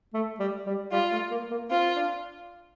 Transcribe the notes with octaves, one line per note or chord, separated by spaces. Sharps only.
A3
G3
G3
G3 F4
A3
A#3
A#3
C4 F4
D4